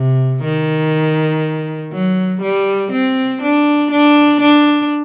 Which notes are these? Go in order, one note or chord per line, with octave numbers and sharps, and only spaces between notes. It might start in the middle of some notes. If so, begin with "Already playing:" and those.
Already playing: C3
D#3
F#3
G3
C4
D4
D4
D4